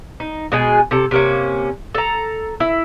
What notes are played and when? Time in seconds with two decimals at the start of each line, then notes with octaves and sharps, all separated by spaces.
0.20 D#4
0.52 B2 G#3 G#4
0.91 C3 A4
1.11 C3 A#3 C#4
1.95 A4 A#5
2.60 E4